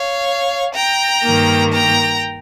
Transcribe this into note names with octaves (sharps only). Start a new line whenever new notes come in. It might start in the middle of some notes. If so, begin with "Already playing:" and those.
Already playing: C#5 F5
G5 A#5
G2 D#3 A#3
G5 A#5